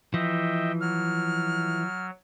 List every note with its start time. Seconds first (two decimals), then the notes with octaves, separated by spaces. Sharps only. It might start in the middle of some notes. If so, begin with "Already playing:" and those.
0.14 E3 F3 D#5 E5 G5
0.81 F#3 F6